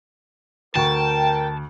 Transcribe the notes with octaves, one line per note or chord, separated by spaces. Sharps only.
D2 A#4 G5 A5 C#6